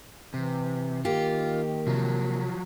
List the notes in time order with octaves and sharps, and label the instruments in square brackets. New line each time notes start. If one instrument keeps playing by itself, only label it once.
[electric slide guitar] C3 [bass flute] E3
[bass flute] D#3 [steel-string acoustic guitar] A#3 G4 [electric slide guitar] F4
[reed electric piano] C3 [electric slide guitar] F3 F#3